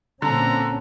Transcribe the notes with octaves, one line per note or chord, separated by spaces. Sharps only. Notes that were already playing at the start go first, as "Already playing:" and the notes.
A#2 D3 C4 C#4 A#5